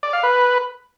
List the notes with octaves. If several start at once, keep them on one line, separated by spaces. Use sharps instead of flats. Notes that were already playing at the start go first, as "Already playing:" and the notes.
D5
F5
B4